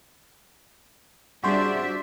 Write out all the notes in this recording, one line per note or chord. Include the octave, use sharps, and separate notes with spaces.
G3 D4 F4 F#4 G#4 C5 D5 E5